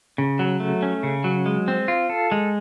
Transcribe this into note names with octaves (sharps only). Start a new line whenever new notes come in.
C#3
F#3
A3
C#4
C#3
F#3
G#3
C4
F4
A4
G#3